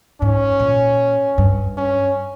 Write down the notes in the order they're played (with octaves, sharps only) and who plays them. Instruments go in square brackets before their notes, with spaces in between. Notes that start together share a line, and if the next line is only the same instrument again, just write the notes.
[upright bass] G#2 [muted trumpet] C#4
[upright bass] A#2
G2
[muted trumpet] C#4